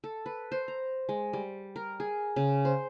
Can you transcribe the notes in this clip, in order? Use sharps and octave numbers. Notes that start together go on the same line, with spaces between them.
A4
B4
C5
A#5
G#3
G3
A#4
G#4
C#3
C5